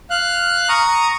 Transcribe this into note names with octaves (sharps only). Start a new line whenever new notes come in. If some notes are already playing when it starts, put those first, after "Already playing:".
F5 F#6
A#5 C#6 D#6